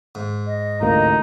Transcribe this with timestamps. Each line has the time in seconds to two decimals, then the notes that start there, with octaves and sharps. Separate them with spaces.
0.15 G#2
0.47 D#5
0.81 A1 D2 A#3 D#4